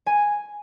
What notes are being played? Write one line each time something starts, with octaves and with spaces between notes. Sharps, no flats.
G#5